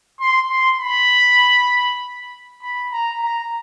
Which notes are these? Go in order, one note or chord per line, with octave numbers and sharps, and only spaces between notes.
C6
C6
B5
B5
A#5
A#5